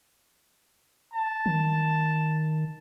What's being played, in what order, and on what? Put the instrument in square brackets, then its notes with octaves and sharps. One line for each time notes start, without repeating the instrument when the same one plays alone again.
[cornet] A5
[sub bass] D#3